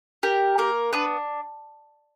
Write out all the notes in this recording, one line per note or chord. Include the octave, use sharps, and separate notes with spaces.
G4 A#4
A#3 A#4
B3 D4 B4